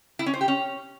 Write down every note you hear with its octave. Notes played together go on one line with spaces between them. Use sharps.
E4
C#4
C5
G4
C#4